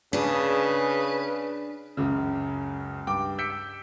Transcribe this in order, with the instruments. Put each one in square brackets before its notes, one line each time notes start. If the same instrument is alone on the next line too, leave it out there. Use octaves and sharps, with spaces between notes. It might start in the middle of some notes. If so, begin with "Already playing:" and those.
[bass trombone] C#3 [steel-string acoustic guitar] D4 G#4 [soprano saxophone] B4
[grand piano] C#2 F#2 C#3
G2 G5 D6
E6 G6 B6 C#7 D7